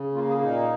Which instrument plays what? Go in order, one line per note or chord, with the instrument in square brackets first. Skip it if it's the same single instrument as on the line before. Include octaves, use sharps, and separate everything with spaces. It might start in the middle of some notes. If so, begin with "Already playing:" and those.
Already playing: [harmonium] C#3
A#3 F4
G#4
A#2 D#4